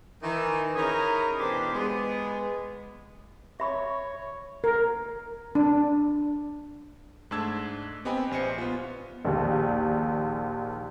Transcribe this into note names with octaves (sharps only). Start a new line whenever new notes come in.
D#3 E3
C#4 D#4 E4 G#4 A#4
B2 E3 D4 G4 B4 C5
G#3 B3
C#5 E5 B5 C#6
A#4
D4
G#2 A3 D4 A5 E6 G#6
B3 C4 G4 D#5 G#5 B5
A#1 C5 G#5 C#7
B3 F4
A#1 D#2